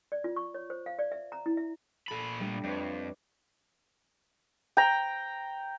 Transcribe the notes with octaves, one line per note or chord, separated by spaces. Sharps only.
D5
F4
C#6
C#5
C5
F5
D5
E5
A#5
E4
E5
A#2 A4 B5 A6
G3 A3 D4
F2 B4 C#5 D5
G5 A#5